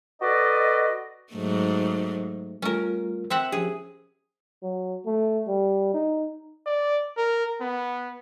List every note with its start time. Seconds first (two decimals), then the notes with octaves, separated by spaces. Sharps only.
0.22 F#4 A4 B4 D5 D#5
1.33 G#2 F#3 A3
2.62 G3 A3 C#4 F4 A#4
3.30 C4 E5 F#5
3.52 F3 C#4 G4 G#4
4.63 F#3
5.06 A3
5.47 G3
5.94 D#4
6.67 D5
7.18 A#4
7.61 B3